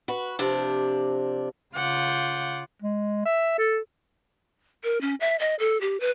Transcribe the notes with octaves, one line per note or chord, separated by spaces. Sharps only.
F#4 B4
C3 F3 D4
C#3 F4 F#5 D6 G6
G#3
E5
A4
A#4
C#4
E5
D#5
A4
G4
B4